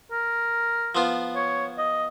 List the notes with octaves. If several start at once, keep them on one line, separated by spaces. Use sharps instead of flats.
A#4
F3 B3 F4
C#5
D#5